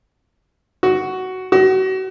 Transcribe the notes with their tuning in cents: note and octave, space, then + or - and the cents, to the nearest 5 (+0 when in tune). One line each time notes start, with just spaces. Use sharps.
F#4 +10
F#4 +35